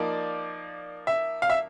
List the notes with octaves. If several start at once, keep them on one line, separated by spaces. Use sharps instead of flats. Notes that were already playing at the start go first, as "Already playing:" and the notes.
Already playing: F3 A#3 D#4 D5
E5
F5
E5